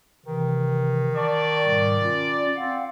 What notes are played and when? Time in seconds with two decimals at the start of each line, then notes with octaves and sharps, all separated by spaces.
0.26 C3 D#3 E3
1.16 D5 A5 C#6
1.64 G#2 B2 G3
2.02 C#4 F4
2.56 C4 F5 F#5